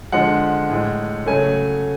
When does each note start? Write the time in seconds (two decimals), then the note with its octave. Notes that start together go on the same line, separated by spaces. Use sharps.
0.12 D3 F3 G#3 F#5
0.70 A2 G#3
1.26 C#3 F#3 A3 G#5